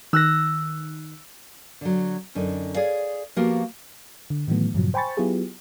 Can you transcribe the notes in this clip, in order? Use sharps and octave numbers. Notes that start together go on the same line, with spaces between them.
D#3 E6 F#6 A#6
D3 F#3
F#2 D3 D#4
G#4 C#5 D5 F5
F3 A#3 B3 F#4 G4
D3
A2 D#3 E3 F#3 A3 B3
G2 A#2 C#3 F3 F#3
C5 G5 G#5 B5 C#6 A6
F#3 B3 E4 F4 G4 G#4